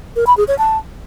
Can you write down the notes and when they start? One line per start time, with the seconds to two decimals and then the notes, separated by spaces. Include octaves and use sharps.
0.16 A#4
0.27 B5
0.37 G#4
0.48 C#5
0.59 A5